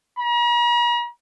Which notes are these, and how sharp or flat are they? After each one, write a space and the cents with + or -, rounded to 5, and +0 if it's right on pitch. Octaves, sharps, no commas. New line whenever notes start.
A#5 +45